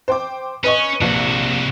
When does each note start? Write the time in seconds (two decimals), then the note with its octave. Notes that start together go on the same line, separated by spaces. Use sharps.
0.08 C5 G5 D6
0.64 C#4 B4 D#5 C#6
1.01 A#1 C3 F#4